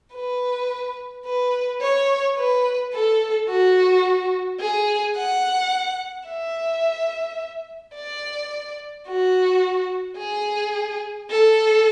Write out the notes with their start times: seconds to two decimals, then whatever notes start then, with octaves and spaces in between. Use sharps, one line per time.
0.15 B4
1.26 B4
1.81 C#5
2.37 B4
2.93 A4
3.49 F#4
4.60 G#4
5.16 F#5
6.28 E5
7.95 D5
9.07 F#4
10.18 G#4
11.30 A4